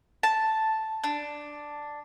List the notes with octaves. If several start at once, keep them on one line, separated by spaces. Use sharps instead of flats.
A5
D4